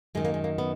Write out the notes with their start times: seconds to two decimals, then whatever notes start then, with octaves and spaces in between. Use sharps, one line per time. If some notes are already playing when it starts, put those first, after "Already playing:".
0.15 F#2 D#3 G#3
0.25 A#3
0.34 G#3
0.44 A#3
0.58 B3